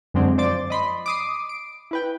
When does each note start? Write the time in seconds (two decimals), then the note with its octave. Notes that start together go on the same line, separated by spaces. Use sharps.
0.14 F#2 D3 F#3 G#3 C4 D4
0.38 F3 C5 D5 D6 A6
0.70 D#5 B5 C6
1.06 D6 D#6 C7
1.49 D7
1.91 E4 B4 G5